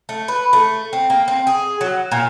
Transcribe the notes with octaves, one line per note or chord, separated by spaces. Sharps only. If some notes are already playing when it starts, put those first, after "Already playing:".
A3
B4
A3
C4
A#3
C4
G#4
F#3
A#2